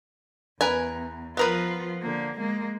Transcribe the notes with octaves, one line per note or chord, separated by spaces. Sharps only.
E2 A#4 B4 G#5
F3 B3 F4 A#4 B4
D3 A#3
G#3 A#3